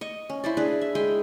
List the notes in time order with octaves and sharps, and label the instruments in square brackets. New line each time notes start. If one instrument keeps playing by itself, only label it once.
[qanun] D#5 C#6
C#4
E4 C5 D5
D4 G#4 B4
E5
G#3 G#4 G5